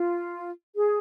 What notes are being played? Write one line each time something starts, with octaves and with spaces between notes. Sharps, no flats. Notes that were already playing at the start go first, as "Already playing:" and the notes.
Already playing: F4
G#4